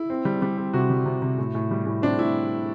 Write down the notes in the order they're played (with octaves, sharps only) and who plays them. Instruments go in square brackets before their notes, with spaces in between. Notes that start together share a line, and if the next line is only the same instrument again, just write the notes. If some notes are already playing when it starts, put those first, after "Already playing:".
Already playing: [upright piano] E4
C4
G3
G3
C4
C3 F#4
G3
C3
C3
A2
A2
G3
A2
C4 D4
A2 E4